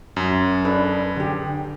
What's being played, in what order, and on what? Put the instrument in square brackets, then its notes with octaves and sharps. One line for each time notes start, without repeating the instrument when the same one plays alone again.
[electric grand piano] F#2
[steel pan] D4 A4 B4
D3 G4